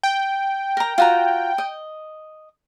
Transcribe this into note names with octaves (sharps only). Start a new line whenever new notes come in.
G5
A#4 A#5
F4 F#4 A#5
D#5